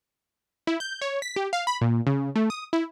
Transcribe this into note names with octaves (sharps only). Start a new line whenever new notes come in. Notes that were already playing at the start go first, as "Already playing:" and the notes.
E4
G6
C#5
B6
G4
F5
B5
A#2
C#3
A3
D#6
E4